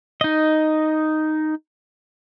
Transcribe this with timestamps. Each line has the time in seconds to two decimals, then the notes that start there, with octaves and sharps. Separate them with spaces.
0.21 D#4 D#5